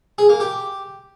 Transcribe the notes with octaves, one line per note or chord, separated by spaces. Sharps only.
G#4
A#3
G4